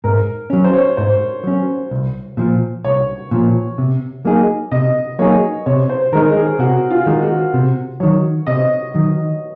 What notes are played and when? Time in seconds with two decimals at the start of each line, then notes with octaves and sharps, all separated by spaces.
0.04 G#2 A#4
0.50 F#3 C#4
0.64 C5
0.73 C#5
0.97 G#2 C5
1.44 F#3 C#4
1.91 C2
2.37 A#2 F3
2.84 C2 C#5
3.31 A#2 F3
3.78 C3
4.25 F#3 A#3 D#4 G#4
4.71 C3 D#5
5.19 F#3 A#3 D#4 G#4 C#5
5.66 C3 C#5
5.89 C5
6.13 D#3 A#4
6.15 G#3 D#4
6.36 G#4
6.59 C3 F#4
6.90 F4
7.06 D#3 G#3 D#4
7.22 F#4
7.54 C3
8.00 D#3 F#3 C#5
8.47 C3 D#5
8.94 D#3 F#3